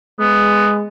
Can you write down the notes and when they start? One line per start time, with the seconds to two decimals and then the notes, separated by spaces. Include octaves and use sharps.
0.20 G#3 B3